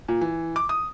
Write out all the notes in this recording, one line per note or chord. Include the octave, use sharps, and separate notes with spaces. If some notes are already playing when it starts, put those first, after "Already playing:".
A#2
E3
D6
D#6